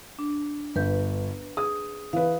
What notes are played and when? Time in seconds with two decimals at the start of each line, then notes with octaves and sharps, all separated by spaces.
0.19 D4
0.76 G1 B4 G6
1.57 G#4 D#6
2.13 E3 B4 F5